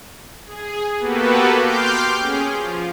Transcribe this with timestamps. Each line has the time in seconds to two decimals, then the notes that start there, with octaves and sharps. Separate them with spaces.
0.46 G#4
1.00 A#3 B3 F#4 G4 A4 B4
1.58 G5 C6 D6 F6 G6
2.19 C#4 G#4
2.52 F3